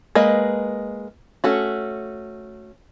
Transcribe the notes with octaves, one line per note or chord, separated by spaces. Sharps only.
G#3 A#3 B4 D#5
A3 C#4 F#4